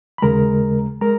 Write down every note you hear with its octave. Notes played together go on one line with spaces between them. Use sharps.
B5
D#2 C#3 G#3 A#4 A#5
G#3 A#4 A#5